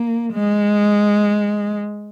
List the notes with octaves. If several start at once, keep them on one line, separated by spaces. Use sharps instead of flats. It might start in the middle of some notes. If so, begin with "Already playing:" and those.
Already playing: A#3
G#3